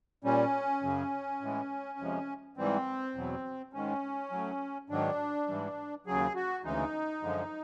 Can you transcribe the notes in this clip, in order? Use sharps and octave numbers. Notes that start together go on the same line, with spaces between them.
A#2 G3 C#4
F#2 C#3 F#3
A2 E3 G#3
F2 C3 F3 G#3
G#2 E3 G3 C4
E2 B2 F#3
G#2 D#3 G#3 C#4
A2 F#3
G#2 D#3 F#3 D4
G#2 E3 G3
D#2 C#3 F#3 G#4
F#4
D2 C#3 E3 G#3 D#4
F#2 D3 F3 G#3